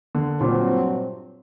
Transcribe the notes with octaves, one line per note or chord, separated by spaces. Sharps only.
D3
G2 A#2 F#3 C4